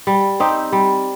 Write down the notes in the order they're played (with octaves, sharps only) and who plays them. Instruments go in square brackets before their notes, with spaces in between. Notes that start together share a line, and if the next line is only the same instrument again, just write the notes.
[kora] G3
C4 D#4 G4
G3